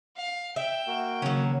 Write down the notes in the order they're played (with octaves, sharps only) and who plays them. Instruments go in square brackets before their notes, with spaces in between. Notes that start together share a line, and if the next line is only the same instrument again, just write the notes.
[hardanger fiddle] F5
[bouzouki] E5 [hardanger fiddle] G5
[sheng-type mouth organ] A#3 F#4
[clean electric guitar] D#2 C#3 [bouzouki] F#3 C#4